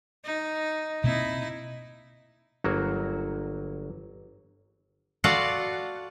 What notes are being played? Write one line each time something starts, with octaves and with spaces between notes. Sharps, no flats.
D#4
B2 A#3 C4 D#4 E4
G1 F#3 A#3 F#4
F4 F#4 A4 D5 F5 F#5